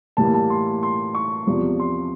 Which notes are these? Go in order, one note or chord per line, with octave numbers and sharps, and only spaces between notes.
A2 E3 G3 A#3 A5
A5
C6
C6
C#6
E2 C3 F3
C6